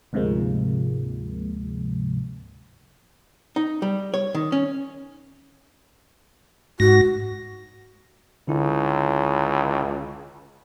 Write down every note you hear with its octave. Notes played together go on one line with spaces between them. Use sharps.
D2 G#2 C3 F3 G#3 A#3
D#4
G3
C#5
D#3
C#4
G#2 F#4 A#6
C#2 D3 E4